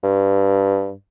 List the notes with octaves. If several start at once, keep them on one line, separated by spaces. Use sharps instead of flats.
G2